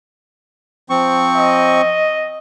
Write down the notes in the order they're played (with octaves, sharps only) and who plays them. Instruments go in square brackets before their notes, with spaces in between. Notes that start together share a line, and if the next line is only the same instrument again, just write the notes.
[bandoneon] F3 C4 C#6
[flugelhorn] D#5